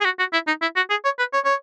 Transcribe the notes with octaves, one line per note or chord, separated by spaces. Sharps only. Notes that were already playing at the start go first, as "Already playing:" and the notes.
G#4
F#4
F#4
E4
D#4
E4
F#4
G#4
C#5
B4
C#5
C#5